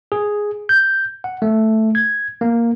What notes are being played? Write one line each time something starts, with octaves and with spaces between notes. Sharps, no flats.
G#4
G6
F#5
A3
G#6
A#3